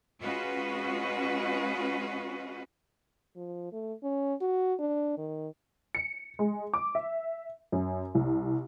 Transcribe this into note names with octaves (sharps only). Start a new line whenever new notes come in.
G#3 C#4 F4 F#4 B4 D#5
F3
A3
C#4
F#4
D4
D#3
C#7
G#3
D6
E5
F#2
C2